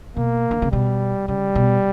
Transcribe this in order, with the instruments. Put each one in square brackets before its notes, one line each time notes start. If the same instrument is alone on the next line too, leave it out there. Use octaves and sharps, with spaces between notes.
[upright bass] B2 [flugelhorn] A#3
[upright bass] D3
C#3
[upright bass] B2 [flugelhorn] G3
[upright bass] C#3 [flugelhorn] G3
[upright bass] B2